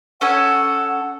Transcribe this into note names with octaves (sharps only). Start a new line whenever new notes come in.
C#4 A4 F#5 G#5